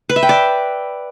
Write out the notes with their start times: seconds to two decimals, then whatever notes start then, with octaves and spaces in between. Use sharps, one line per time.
0.09 B4
0.16 E5
0.23 G5
0.29 D5